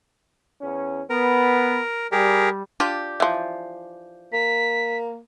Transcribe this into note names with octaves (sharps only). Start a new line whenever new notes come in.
E2 C#4
B3 A#4
G3 G4 G#4 A#4
D4 F4 G4
E3 F3
A#3 B6